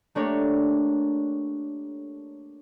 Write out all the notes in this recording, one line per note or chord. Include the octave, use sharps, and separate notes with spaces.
A3 A#3 D4 G4 A#4 C#5